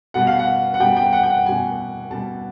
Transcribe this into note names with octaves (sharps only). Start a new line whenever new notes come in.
B2 G3 F#5
F5
F#5
F#5
B2 G3 G5
G5
F#5
G5
F#5
B2 G3 G#5
B2 G3 A5